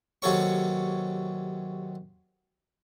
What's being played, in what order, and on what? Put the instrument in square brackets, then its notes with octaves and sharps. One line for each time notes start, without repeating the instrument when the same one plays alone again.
[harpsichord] D#2 C3 F#3 A4 C#5 C#6